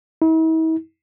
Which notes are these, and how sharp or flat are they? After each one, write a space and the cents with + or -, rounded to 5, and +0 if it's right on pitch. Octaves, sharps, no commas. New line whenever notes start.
E4 -45